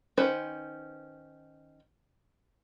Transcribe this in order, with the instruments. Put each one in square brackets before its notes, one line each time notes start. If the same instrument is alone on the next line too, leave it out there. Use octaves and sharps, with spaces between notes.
[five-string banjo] D#3 C#4 B4 C5